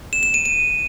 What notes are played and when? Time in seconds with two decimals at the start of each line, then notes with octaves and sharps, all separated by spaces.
0.13 E7
0.23 E7
0.34 D#7
0.46 D#7